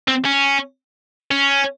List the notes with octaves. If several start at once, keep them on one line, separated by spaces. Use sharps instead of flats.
C4
C#4
C#4